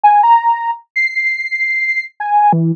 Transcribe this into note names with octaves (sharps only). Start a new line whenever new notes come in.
G#5
A#5
C7
G#5
E3